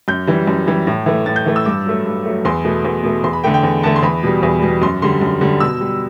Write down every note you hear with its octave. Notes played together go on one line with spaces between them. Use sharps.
F#2 G6
E3 G3
F#2
E3 G3
A2
E3 A3
A2 A6
G6
E3 A3
E6
G2 D6
F#3 A3
G2
F#3 A3
E2 C6
B2 A3
E2
B2 A3
E2 C6
B5
D3 A3 G5
G5
E2
D3 A3 A5
C6
E2 B5
B2 G3
E2
B2 G3
F#2 C6
D3 G3 C6
F#2
D3 G3
B2 E6
G3